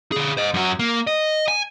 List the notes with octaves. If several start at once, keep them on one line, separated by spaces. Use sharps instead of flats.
D3 G#4
C5 D#5
F#2 F#4
A#3
D#5
G#5